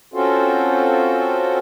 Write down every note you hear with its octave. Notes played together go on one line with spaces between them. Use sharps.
C4 C#4 F4 F#4 A4 C5